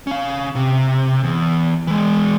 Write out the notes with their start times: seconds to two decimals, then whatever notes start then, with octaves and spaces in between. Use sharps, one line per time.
0.07 C#4 F5
0.55 C3
1.24 E2
1.87 E3 G#3